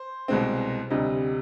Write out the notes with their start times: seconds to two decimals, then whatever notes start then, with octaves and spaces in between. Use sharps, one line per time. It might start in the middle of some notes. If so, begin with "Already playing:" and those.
Already playing: C5
0.28 C2 B2 G#3 C4
0.90 D2 C3 G3 D#5